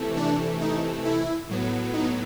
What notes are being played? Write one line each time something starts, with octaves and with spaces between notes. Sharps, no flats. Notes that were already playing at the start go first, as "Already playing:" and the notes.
Already playing: C3 E3 A3
D4
D#4
E4
A2 F#3 B3
D#4